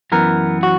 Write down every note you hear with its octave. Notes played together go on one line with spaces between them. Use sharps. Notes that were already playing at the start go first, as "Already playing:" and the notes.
F#2 E3 B3 A#4
F#4